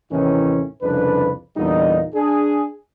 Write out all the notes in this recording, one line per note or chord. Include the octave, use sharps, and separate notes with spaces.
D#2 A2 C3 D#3 E3 C#4
C2 F2 C#3 D4 B4
E2 A#2 D3 G3 D#4
D4 G#4